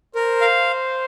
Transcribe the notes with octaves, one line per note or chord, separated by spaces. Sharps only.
A#4 C5
F5